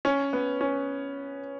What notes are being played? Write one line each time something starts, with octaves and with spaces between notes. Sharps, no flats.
C#4
B3
C#4